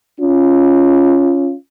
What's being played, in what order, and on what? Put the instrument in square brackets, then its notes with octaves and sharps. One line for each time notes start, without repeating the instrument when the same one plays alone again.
[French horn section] C#4 F4